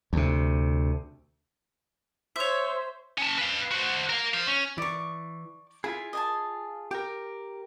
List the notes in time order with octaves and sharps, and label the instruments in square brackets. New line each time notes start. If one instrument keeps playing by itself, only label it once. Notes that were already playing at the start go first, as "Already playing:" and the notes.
[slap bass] D2 C3
[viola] C5 [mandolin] C#5 E5
[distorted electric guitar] C#4 A5
B4 F5
F#4 C5
A#4 F5
C5 F5
C#4
[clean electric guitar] E3 [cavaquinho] D5 C#6
[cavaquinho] E4 [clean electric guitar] F4 G#4
[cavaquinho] D#5 G#5 A5
[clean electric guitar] G4 A#4 [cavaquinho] G5